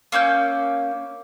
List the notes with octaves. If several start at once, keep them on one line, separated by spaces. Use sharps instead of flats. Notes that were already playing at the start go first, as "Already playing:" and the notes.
A#3 C#4 E6 G6